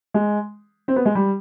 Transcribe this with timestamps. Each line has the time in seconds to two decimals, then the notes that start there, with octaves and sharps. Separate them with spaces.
0.14 G#3
0.88 C4
0.96 B3
1.05 G#3
1.15 G3